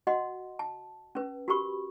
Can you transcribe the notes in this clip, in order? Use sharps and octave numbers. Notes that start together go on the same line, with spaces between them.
F#4 D#5 F#5 C6
A5
C#4 B4
F#4 G4 A#4 B5 C#6